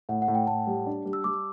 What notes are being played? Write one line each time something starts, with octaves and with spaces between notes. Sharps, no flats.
A2 F#5
F#5
A2
G5
A2 A5
G3
D4
G3
E6
G3 D6